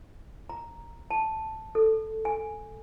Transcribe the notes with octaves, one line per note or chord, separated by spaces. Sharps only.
A#5
A5
A4
G#5